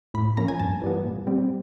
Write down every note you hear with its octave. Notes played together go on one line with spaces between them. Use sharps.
A2 B5
F3 A#3 C#4 A#5
G#5
G2 A5
E3 G3 B3
A#2
G3 C4